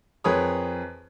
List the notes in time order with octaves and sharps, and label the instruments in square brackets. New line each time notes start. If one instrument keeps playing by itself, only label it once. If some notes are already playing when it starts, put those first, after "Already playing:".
[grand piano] F2 G#4 A#4 B4 C#5 D#6